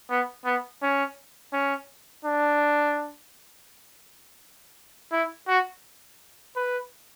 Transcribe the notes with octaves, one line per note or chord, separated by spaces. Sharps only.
B3
B3
C#4
C#4
D4
E4
F#4
B4